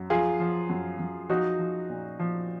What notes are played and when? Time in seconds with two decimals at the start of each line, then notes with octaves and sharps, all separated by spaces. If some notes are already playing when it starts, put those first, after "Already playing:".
Already playing: F#2
0.10 F3 F4 G#4
0.39 F3
0.70 F#2
0.99 F#2
1.29 F3 D#4 F#4
1.59 F3
1.89 A#2
2.19 F3